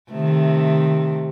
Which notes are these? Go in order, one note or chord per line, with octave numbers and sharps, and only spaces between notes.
C3 D#3 A3